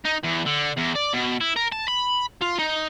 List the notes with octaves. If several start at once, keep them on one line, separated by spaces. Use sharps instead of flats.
D#4
E2
D3
E2
D5
B2
E4
A#4
A5
B5
F4
D#4